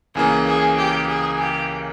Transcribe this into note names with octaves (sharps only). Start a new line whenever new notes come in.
C#2 C#3 E3 A#3 G#4
G#4
G4
G#4
G4